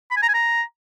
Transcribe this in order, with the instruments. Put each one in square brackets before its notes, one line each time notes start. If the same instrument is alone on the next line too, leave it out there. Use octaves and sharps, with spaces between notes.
[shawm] B5
G#5
A#5
G#5
A#5